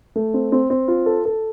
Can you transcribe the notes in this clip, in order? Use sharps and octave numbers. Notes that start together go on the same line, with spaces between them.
A3
C4
C4
C4
F4
A4
A4